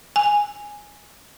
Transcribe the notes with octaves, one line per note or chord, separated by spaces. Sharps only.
G#5